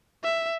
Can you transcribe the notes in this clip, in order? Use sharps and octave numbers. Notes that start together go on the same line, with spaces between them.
E5